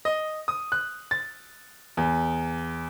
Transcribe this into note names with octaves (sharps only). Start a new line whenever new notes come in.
D#5
D#6
F#6
A6
E2